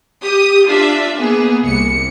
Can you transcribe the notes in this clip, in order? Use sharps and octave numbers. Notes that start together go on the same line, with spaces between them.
G4 D#6
D4 F4 D5 E5
A#3 B3 G#4
C2 C#7